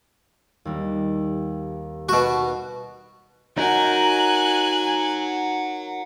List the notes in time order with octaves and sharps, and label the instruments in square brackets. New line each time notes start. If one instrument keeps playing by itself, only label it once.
[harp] D#2 G3
[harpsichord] B2 F#4
[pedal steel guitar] D#4 F#4 A#4 [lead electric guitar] C#5 F#5 [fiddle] G#5 F#6